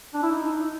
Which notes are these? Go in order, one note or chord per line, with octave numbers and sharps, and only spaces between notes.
D4
E4
D#4